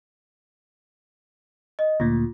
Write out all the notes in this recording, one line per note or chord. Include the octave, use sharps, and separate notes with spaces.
D#5
D2 A#2 F4